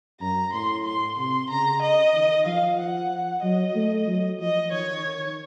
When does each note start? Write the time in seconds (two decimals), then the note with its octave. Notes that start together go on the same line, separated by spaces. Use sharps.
0.21 F#2 A#5
0.53 A2 C6
0.85 C6
1.17 C3 C6
1.50 C#3 A#5
1.82 D#5
2.14 D#3
2.46 F3 F5
2.79 F#5
3.42 F#3 D#5
3.75 A3
4.07 F#3
4.39 F3 D#5
4.72 D#3 C#5
5.04 D#3